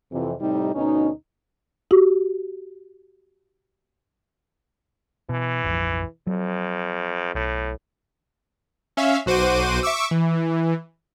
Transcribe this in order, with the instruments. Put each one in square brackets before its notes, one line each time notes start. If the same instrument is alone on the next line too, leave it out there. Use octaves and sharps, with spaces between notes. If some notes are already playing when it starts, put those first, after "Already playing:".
[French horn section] F2 C3 E3
A2 C3 G3 D#4
D2 B2 C#4 D#4
[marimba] F#4 G4
[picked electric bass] B2 [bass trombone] E3
[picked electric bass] F1 A#1 F2
[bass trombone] F2 [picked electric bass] F#3
[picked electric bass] B1 [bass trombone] A2
[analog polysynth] C#4 E5 F5
B1 F#4 C5 D6 D#7
E5 C#6 D6 E6
E3